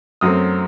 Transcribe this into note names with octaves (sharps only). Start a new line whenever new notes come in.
F#2 F#3 A3 C4 D#6